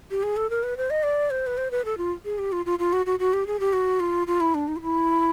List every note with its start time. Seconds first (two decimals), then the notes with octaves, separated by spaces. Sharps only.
0.11 G4
0.23 G#4
0.37 A4
0.50 A#4
0.63 B4
0.77 C5
0.90 D#5
1.03 D5
1.30 C5
1.47 B4
1.57 C5
1.71 B4
1.85 A4
1.98 F4
2.25 G#4
2.38 G4
2.52 F4
2.66 F4
2.79 F4
2.93 F#4
3.06 F#4
3.19 F#4
3.33 G4
3.47 G#4
3.60 G4
3.73 F#4
4.00 F4
4.27 F4
4.40 E4
4.54 D4
4.68 D#4
4.76 F4
4.81 E4